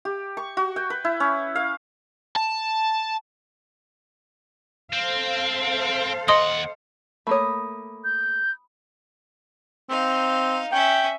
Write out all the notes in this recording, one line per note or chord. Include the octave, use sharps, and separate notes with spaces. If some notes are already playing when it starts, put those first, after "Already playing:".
G4
C#6
F#4
G5
B4
E4
C#4
F5
A5
C4 A4 C5 F5
D#2 D#5 F#5 C6 D#6
A3 A#3 C#5 B5 D#6
G6
C4 D#4 F5
C#4 E5 G5